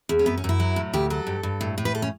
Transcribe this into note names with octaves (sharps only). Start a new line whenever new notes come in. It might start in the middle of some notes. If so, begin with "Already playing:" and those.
E2
C#4
F#2 B3
C#4
F#2
E4
F#3
A2
D2 G4
F#3 A4
G2
G2
A2
A2
B4
A4
C#4